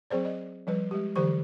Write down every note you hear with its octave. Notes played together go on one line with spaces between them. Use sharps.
F#3 C4 G#4 C5 D5
D#5
F3 G3 B4
G#3 G4
D3 E3 F#3 G4 C5 C#6